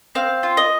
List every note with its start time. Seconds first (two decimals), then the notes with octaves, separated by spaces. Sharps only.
0.15 C4 F5
0.43 F4
0.57 D#5